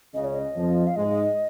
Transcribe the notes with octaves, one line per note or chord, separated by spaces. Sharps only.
C#2 C#3 D#5
C#5
D#5
F2 F3
F5
G#2 G#3 D#5